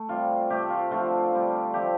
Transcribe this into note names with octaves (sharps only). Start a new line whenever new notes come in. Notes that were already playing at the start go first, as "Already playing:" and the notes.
Already playing: A3
C3 G3 C4 F4
C3 A3 C4 G4
F4
D3 F3 A3 C4 F4
D3 G3 C4
C3 F3 A3 C4 G4